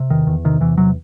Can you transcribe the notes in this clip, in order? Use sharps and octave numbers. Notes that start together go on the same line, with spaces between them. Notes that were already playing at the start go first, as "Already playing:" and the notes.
Already playing: C3
E2 D#3
E2
C3 D#3
E2 E3
C3 F#3